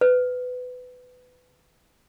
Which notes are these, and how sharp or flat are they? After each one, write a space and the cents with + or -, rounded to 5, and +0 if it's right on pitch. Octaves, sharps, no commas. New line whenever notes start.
B4 +20